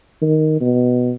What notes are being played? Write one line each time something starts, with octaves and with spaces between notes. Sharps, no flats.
D#3
B2